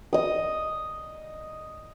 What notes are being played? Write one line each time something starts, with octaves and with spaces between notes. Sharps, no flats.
D#5 D#6